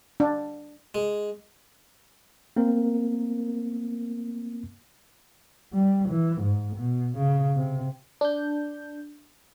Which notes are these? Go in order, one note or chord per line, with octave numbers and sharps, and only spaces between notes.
D4
G#3
A#3 C4 A#4
G3
E3
G#2
B2
C#3
C3
D4 G6